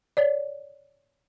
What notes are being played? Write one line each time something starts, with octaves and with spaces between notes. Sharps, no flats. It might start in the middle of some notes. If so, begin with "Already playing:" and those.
C#5 D5